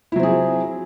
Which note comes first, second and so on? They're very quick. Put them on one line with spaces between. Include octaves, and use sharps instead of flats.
E4 F#3 C4 G#4 F3